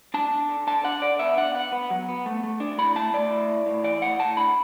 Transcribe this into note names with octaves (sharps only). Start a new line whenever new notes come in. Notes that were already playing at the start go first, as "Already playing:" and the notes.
D4 A5
D4
D3
D3 A5
D4 F#5
D3 D5
B3 E5
D4 F#5
B3 F#5
B3
F#3
B3
A3
A3
D4
A2 B5
A3 A5
A3 D5
E4
A2
A2
E3 D5
A2 F#5
A2 A5
D3 B5